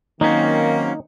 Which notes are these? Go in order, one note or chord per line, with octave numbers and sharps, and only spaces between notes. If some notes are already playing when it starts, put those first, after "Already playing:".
D#3 F#3 A#3 C4 C#4 D#4